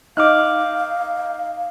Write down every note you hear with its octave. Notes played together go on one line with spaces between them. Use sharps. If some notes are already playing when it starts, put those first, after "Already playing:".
D#4 F5 D6 F6 F#6